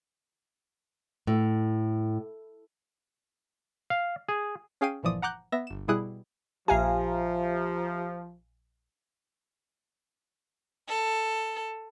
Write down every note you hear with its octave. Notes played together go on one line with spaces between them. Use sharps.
A2
F5
G#4
C#4 G#4 F5 G5 C7 D#7
G1 A#2 E3 F3 D5 D#6
F#5 A#5 D6 F#6 G6
B3 E5 A#6
G1 E7
B2 G3 E4 G#4 D#6 F#6
A#1 F3 G4 E5 F5 G#5 A#5
A4